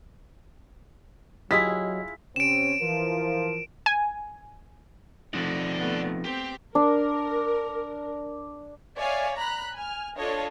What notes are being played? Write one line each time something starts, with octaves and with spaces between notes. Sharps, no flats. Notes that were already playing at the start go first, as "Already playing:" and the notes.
F#3 E4 F4 G4 G#4 D#5 B6
C3 C4 C#4 D7 E7
E3 F3 A#4
G#5
F3 A3 C4 D#4 D5 F#5
A3 B3
C4 G4
D4 A#4
C#5 D5 E5 F5 G#5
A#5 B5 F#6
G#5 F6
D4 F4 A4 C#5 D#5